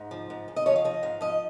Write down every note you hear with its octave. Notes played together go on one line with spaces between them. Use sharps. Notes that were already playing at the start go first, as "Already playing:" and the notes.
Already playing: G#2 D#4
F3
G#2
G#2
D#5
F3 C#5
F5
F3 D#5
G#2 F5
F3 D#5